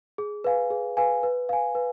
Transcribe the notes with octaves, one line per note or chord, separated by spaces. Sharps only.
G#4
B4 F5 G#5
G#4
B4 F5 G#5
B4
F5 G#5
B4